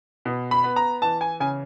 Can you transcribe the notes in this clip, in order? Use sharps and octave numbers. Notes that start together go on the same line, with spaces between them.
B2
B5
B3
A#5
E3 A5
G#5
C#3 G#5